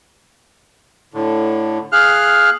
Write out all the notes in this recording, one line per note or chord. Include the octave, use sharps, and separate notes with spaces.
A2 D3
G#4 F5 F6 F#6